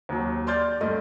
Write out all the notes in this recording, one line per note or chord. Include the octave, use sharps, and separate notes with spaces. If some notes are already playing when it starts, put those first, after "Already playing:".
D#2 F#3
D5 C6 F6 G6 A6
G2 A3 D#5